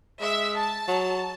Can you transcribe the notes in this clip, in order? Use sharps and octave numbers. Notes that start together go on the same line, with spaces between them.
G#3 E5
A5
F#3